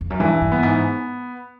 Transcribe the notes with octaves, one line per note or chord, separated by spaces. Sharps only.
F2
F#2
G2 E3
G2
B3
G#2